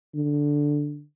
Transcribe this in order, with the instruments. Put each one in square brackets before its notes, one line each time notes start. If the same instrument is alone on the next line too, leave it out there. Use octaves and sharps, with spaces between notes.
[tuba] D3